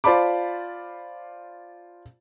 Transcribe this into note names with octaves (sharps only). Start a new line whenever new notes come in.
F4 C5 D5 A5 B5 D6